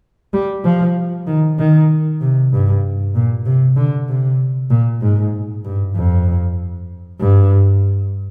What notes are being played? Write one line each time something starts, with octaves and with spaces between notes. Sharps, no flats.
G3
F3
D#3
D#3
C3
G2
A#2
C3
D3
C3
A#2
G#2
G2
F2
G2